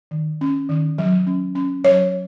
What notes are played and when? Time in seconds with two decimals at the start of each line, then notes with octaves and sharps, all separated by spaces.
0.11 D#3
0.41 C#4
0.69 D#3
0.98 F#3
1.27 C#4
1.55 C#4
1.84 F#3 C#5